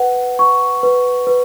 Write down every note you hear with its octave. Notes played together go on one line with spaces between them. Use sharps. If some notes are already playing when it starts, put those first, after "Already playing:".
Already playing: B4 F#5
C#6
B4
B4